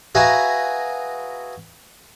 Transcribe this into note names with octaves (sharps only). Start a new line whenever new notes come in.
F#4 G#4 B4 E5 F5 A#5